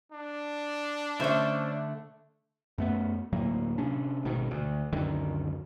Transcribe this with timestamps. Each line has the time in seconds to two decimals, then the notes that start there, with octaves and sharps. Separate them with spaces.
0.12 D4
1.20 D3 A3 C#4 C5 E5
2.78 F#2 A3 B3
3.33 D2 A2 F#3 A#3
3.78 C3 C#4 D4
4.25 G#1 G#2 B2 D#3
4.51 D2
4.93 C#2 F#2 D3 D#3